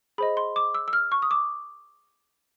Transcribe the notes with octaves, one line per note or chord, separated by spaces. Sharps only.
G#4 C5 D#5 B5
C6
D6
E6
E6
F6
C#6
D#6
D6